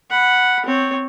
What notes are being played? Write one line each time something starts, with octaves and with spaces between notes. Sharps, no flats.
F#5 B5
C4 C#5